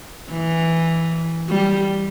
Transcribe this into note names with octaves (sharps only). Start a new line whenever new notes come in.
E3
G3